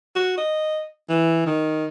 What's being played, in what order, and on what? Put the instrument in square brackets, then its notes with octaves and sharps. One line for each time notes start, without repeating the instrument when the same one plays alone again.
[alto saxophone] F#4
D#5
E3
D#3